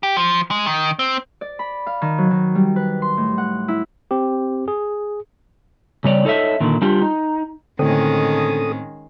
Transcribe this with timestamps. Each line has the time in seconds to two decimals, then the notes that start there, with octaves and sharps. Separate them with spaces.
0.03 G4
0.17 F3
0.51 G#3
0.67 D#3
0.99 C4
1.41 D5
1.59 B5
1.87 F5
2.02 D#3
2.18 F#3
2.31 D#3
2.55 G3
2.76 B4
3.02 C6
3.17 A2
3.38 F#5
3.68 E4
4.11 C4 G4
4.68 G#4
6.04 C#3 G3 C#5 D5
6.25 D#4 A4 C#5 D#5 E5
6.60 A#2 D3 D#3
6.82 G3 D4 F4 G4
7.02 D#4
7.79 A2 D3 D#3 G#3 C4 C#4 A4 D#6